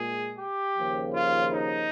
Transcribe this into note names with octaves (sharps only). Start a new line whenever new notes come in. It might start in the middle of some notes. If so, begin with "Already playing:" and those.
Already playing: A#2 G#3 G#4
G4
D#2 C#3 F3
F4
D#4